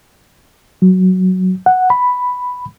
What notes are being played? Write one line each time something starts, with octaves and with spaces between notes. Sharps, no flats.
F#3
F#5
B5